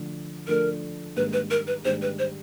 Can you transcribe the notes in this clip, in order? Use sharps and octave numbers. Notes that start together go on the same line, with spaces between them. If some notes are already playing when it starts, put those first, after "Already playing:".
Already playing: D3 F3 A3 D4
D3 F3 A3 D4 A#4
G#2 D#3 G3 A#3 D4 B4
B4
A#4
B4
G#2 D#3 G3 A#3 D4 C5
B4
C5